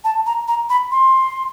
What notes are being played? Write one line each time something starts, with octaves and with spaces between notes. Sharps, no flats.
A5
A#5
A#5
B5
C6